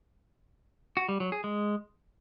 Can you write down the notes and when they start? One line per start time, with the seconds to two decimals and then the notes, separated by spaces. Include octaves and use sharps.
0.97 F#4
1.09 G3
1.20 F#3
1.32 G#4
1.44 G#3